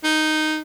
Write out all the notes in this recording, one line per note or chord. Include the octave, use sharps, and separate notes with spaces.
D#4